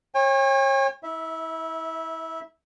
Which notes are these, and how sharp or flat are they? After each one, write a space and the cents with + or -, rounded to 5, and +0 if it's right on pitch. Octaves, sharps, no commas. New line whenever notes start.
C#5 -30 G5 +45
E4 -35 E5 -10